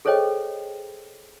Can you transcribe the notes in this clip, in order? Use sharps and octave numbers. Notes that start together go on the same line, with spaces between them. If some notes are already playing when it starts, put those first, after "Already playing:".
G#4 A4 C5 C#5 D#5 G5